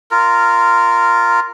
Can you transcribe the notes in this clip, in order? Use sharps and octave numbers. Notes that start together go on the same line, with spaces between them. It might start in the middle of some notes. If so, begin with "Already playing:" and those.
F4 A#4